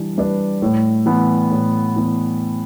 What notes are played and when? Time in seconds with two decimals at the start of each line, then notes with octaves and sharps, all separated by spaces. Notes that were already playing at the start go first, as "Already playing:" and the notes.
Already playing: E3 G3 D4
0.17 G3 D4 B4 D5
0.62 A2
1.06 E3 B3
1.51 A2
1.96 E3 B3